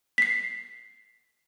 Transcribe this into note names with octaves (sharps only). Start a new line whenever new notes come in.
B6 C7